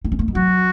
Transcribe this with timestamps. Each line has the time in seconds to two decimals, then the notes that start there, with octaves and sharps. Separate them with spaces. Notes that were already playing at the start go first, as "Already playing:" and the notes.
0.04 D#4
0.12 C#4
0.19 A#3
0.28 G#3
0.35 F#3 F#4